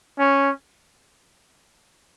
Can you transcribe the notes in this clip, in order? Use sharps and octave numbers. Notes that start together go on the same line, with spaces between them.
C#4